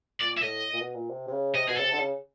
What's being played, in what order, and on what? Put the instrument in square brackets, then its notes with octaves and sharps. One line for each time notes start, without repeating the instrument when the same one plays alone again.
[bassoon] A#2 [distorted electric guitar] D5
[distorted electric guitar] E5
[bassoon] A2 [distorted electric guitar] D#5
[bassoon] A#2
B2
A#2
C3
C3
C#3
[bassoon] C3 [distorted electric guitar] D#5
[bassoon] B2 [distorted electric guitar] G#4
[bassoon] C#3 [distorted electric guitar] A4
[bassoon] C3
D3
C#3